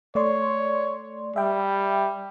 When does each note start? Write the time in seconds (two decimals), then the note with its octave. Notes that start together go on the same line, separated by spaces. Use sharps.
0.15 A3 C#5 D5 C6
1.36 G3 E5 G5